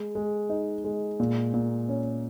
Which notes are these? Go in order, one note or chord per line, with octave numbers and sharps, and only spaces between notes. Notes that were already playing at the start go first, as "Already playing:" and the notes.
Already playing: G#3
G#3
D#4
G#3
A#2
A#2
C#4